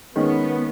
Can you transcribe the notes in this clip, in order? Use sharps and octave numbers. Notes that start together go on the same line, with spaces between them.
D#3 G#3 B3 C#4